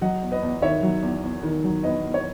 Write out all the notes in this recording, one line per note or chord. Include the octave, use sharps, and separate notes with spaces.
F#3 D#5 F#5
E2
B4 D#5
E2
D#3 C#5 E5
F#3
E2
E2
D#3
F#3
E2 B4 D#5
E2
C#5